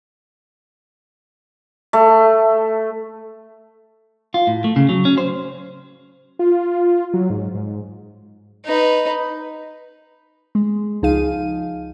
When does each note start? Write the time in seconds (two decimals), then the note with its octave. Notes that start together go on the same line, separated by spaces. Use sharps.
1.93 A3
4.34 F4
4.47 A2
4.64 A3
4.76 C#3
4.89 F#3
5.05 C#4
5.18 C5
6.39 F4
7.14 F#3
7.30 G#2
7.55 G#2
8.66 D#4 B4
10.55 G#3
11.02 C#2 F3 D#4 G#4 F5 D#7